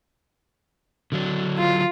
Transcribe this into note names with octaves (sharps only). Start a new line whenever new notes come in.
D3 F#3 D4
F4